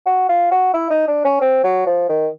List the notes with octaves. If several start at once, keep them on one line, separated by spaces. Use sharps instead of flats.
F#4
F4
F#4
E4
D#4
D4
C#4
C4
F#3
F3
D#3